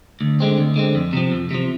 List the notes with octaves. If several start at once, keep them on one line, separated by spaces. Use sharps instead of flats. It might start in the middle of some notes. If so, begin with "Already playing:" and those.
D2
D3 G#3 C4
D2
D3 G#3 C4
F2
C3 F3
F2
C3 F3